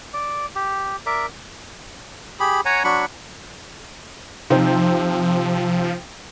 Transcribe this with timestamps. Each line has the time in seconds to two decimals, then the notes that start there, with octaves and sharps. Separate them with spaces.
0.14 D5
0.55 G4
1.06 A#4 D5 E5
2.40 G4 G#4 B5
2.65 C#5 F#5 G#5 A#5
2.84 F#3 D4 B5 C#6
4.50 C3 F3 D#4 C5